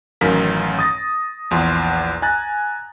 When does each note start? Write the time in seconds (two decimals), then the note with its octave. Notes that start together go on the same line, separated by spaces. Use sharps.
0.21 A1 F#2 D#3 A#4 F5 B6
0.79 D#6 A6 A#6
1.51 A#1 E2 F4 C6
2.22 G#5 A#5 F#6 A6